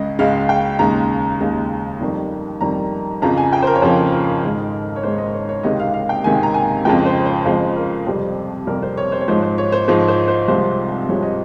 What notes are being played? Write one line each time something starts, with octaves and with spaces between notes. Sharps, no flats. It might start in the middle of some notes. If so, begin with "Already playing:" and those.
Already playing: C#2 C#3 G#3 D#5
C#2 C#3 G#3 F5
G5
D#2 C#3 G#3 A#5
D#2 C#3 G#3
F2 D#3 G3
F2 D#3 G3 A#5
F2 C#3 F3 A#5
G#5
G5
C5
A#4
C#5
F2 C#3 F3 C5
A#4
G#2 D#3 G#3
C#5
G#2 D#3 G#3 C5
D#5
C#5
C#5
C#2 C3 D#3 G#3 D#5
F5
F5
G5
C#2 C3 D#3 G#3 G#5
A#5
G#5
F2 C#3 F3 G#3 G5
C5
C5
F2 C#3 F3 G#3 C5
A#4
F2 C3 G3 C5
F2 C3 G3 A#4
C5
C#5
C5
C#5
G#2 F3 G#3 C5
C5
C#5
C5
G#2 F3 G#3 C5
C5
C5
C2 C3 F3 G#3 C5
C2 C3 F3 G#3 C#5
D#5